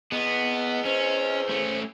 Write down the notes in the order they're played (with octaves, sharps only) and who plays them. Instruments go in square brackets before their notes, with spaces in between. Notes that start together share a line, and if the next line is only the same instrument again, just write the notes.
[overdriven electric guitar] B3 [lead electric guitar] G#4 B4 [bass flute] D#5
[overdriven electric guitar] C#4 [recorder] C5
[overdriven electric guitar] A3 C#4